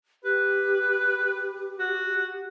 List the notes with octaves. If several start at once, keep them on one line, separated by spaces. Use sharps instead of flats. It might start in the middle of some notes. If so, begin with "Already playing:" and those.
G4 B4
F#4